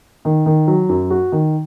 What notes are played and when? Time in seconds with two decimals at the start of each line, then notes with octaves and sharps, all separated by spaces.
0.25 D#3
0.46 D#3
0.67 F#3
0.89 F#2
1.10 F#4
1.32 D#3